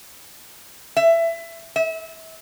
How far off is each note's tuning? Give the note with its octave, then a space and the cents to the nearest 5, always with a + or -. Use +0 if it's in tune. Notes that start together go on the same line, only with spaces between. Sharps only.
E5 +20
E5 -30